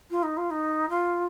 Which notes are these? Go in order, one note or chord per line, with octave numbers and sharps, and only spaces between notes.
F4
D#4
F4
D#4
F4